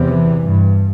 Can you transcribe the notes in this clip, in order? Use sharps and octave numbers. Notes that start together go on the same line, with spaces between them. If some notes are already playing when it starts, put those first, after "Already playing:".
Already playing: E2 C3
E3
G2